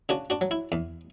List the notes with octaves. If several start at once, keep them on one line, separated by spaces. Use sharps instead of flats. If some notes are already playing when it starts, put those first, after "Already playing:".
C#3 D4 F#4
D4 F#4
F#3
E4
E2